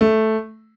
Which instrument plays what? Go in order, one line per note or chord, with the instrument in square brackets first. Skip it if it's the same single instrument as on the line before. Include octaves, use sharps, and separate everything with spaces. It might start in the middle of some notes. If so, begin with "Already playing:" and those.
[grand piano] A3